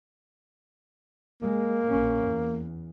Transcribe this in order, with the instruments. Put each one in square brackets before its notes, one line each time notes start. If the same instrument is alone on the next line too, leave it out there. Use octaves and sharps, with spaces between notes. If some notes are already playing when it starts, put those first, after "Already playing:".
[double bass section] G#3 [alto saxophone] A#3
[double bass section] A#1 C#4
E2